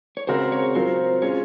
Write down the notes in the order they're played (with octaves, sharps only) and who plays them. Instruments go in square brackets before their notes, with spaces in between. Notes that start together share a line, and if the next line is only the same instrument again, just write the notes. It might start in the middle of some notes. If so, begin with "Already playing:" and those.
[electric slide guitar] C#5
[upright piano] C#3 G#3 C4 F#4 A#4 [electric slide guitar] C5
[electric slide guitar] C#5
[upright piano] F#3 C4 F4 A#4 [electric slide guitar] C5
[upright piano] G#3 C#4 F4 [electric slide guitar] C#5